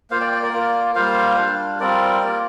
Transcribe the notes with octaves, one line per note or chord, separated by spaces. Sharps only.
A#3 F4 C5 F5
D5 G5
D5 G5
A#4 D5
A#3 F4
G3 A#3 F4 C5 F5
G3 D4 F4
G3 C4 F4 A#4 D5
A#3 F4